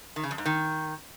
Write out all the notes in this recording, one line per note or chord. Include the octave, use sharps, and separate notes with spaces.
D#3
C#3
F2
G#2
D#3